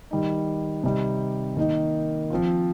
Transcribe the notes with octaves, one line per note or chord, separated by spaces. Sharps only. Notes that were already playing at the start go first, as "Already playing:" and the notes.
D#3 G3 D#4
C3 G3 D#4
D#3 A#3 D#4
F3 C4 F4